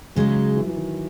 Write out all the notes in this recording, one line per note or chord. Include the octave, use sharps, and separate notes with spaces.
C#3 F#3 G#3 D#4
F#3
E3
E3
D#3